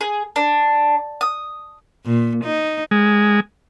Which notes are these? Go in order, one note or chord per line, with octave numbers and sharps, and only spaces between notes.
G#4
D4
D#6
A#2
D#4
G#3